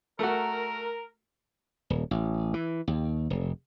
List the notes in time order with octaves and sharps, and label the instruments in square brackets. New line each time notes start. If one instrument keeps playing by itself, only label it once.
[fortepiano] A3 F#4 [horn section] A#4
[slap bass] D#1
A1
E3
D#2
F1